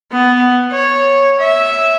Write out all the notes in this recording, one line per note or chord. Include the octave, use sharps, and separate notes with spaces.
B3
C#5
E5